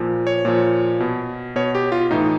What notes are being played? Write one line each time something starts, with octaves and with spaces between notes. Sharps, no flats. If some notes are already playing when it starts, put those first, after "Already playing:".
Already playing: A#2 F3
C#5
A#2 F3
B2
B2 C#5
G4
F4
A2 E3 D#4